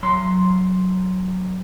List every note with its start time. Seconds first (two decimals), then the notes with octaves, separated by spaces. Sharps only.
0.03 F#3 C6